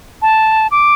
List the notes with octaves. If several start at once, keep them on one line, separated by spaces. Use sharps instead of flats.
A5
D6